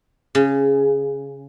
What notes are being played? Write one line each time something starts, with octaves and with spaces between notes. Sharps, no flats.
C#3